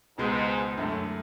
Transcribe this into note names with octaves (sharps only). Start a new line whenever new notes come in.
C#2 G#2 B2 G#3 B3
F#2 A2 D3 A3